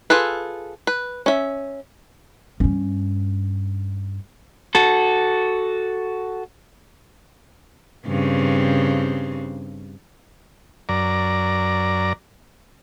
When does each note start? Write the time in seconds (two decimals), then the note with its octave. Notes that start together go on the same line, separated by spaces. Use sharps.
0.10 F4 G#4 A4 B4
0.87 B4
1.26 C#4 E5
2.60 G2 C#4
4.75 F#4 A4
8.07 G2 C#3 C4
10.89 F#2 D5 A#5